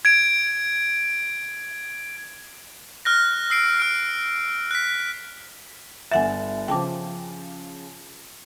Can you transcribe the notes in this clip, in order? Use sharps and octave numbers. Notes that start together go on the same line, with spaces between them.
G#6 D7
F6 F#6 A#6
E6 C7 D7
F6 D7
F#6 B6
G1 E5 F#5 G#5 A6
C#3 F3 G5 A5 D6